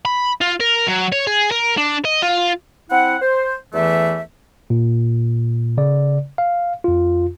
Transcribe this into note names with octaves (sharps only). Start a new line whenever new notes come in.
B5
F4
A#4
F#3
C#5
G#4
A#4
D4
D#5
F4
C4 E4 F#5
C5
E2 E3 A3 E5
A#2
C#3 D5
F5
F2 F4